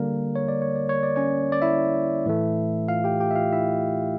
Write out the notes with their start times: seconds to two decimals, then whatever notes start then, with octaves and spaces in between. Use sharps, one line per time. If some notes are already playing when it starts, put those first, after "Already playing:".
Already playing: D3 G3 A#3 A#4
0.36 C#5
0.48 D5
0.62 C#5
0.76 D5
0.89 C#5
1.03 D5
1.16 C#4 C#5
1.52 D5
1.62 E4 E5
2.26 A2 E3 A3
2.88 F4 F5
3.04 G4 G5
3.20 G4 G5
3.31 E5
3.36 F4 F5
3.52 E4 E5